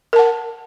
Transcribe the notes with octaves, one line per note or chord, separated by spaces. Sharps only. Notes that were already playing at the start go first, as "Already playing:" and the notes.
A#4 F#5 A5